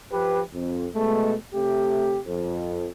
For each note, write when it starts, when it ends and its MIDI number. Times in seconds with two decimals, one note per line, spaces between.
0.11 0.40 53
0.11 0.40 67
0.11 0.40 71
0.54 0.87 41
0.94 1.34 47
0.94 1.34 56
0.94 1.34 57
1.54 2.18 48
1.54 2.18 57
1.54 2.18 67
2.26 2.89 41